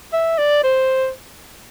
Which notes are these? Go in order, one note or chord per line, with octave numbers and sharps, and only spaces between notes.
E5
D5
C5